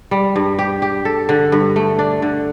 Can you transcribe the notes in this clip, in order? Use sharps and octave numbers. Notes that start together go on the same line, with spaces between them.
G3
G2
G4
G4
A4
D3
G2
A3
D4
D3